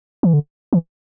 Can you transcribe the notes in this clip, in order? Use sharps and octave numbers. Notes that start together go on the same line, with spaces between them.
E3
D3
E3